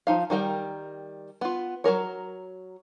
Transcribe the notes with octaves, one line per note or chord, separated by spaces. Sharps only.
F3 D#4 F5
D#3 G3 A#4 G5
B3 F4
F#3 A#3 A#4 C#5